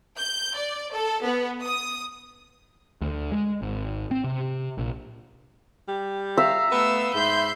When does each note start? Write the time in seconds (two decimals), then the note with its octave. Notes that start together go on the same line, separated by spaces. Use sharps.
0.17 G6
0.55 D5
0.93 A4
1.23 B3
1.63 D#6
3.01 D2
3.32 G#3
3.62 G#1
4.11 C4
4.24 C3
4.78 A#1
5.88 G3
6.37 E5 F5 A#5
6.71 A3 B3 F5 E6
7.14 G#2 E5 B5 C6 G6